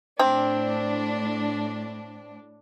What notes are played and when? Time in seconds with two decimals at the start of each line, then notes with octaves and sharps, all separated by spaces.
0.19 A2 C4 D4